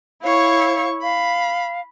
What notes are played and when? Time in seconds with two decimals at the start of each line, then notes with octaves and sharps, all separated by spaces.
0.23 E4 C#5 F5 C#6
1.03 F5 B5